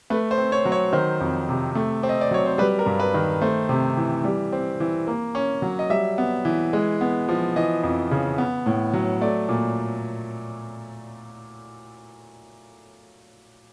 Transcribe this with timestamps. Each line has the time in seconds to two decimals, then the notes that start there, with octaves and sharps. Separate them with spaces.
0.10 A3 B4
0.31 C5
0.38 C4
0.52 C#5
0.65 F#3
0.72 C#5
0.93 D#3 C5
1.21 F2
1.49 C3
1.75 A3
2.03 C4
2.09 D#5
2.21 D5
2.31 F#3 C#5
2.46 C5
2.58 G3 B4
2.79 A#4
2.86 G2
3.00 B4
3.14 D#3
3.42 A3 C5
3.69 C3
3.97 E3
4.24 G3
4.52 C4
4.80 E3
5.07 A#3
5.35 C#4
5.62 F#3
5.79 D#5
5.90 G3 E5
6.18 B3
6.45 E3
6.73 G#3
7.01 B3
7.29 F3
7.56 E3 D#5
7.84 F2
8.11 C#3
8.38 B3
8.66 A2
8.93 F#3
9.21 A3 D5
9.49 A#2